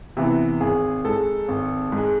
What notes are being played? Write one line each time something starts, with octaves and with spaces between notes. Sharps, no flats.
C3 E3 B3
G#1 G#4
G#2 G#3 A4
G#1
G#2 G#3